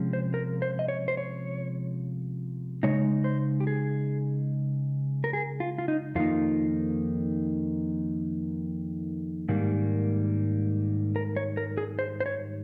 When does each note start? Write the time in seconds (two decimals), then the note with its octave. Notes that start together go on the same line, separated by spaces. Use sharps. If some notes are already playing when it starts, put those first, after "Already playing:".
Already playing: C3 F3 G#3 C#4
0.13 C5
0.34 A#4
0.62 C5
0.79 D#5
0.88 C#5
1.08 C5
1.17 C#5
2.83 C#3 G#3 D#4 C#5
3.24 C5
3.60 G4
3.67 G#4
5.24 A#4
5.33 G#4
5.60 F4
5.78 F4
5.88 D#4
6.15 F2 D#3 A#3 D#4 F4
9.49 G#2 D#3 G3 A#3
11.16 A#4
11.36 C#5
11.57 A#4
11.78 G#4
11.99 C5
12.20 C5
12.26 C#5